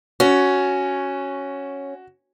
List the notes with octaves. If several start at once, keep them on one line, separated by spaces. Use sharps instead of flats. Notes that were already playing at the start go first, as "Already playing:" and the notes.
C#4 F#4